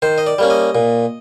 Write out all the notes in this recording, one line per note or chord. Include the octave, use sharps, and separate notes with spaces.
D#3 C5
D#5
D5
G3 A#3 C#4
D#5
A#2